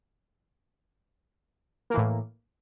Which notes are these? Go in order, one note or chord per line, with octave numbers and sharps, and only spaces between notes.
A2 E3 A#3